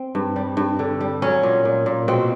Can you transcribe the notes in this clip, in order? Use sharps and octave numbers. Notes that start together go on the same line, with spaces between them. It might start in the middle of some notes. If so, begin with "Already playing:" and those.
Already playing: C4
G2
G3
G2
D3
G3
F#3 C#4
A#2
A#2
A#2
B2 C4